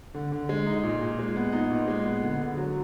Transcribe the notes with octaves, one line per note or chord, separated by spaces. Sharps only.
D3
D3
G#3
D#4
A#2
A#2
G#3
B3
D#4
A#2
G#3
B3
D3
D3
F#3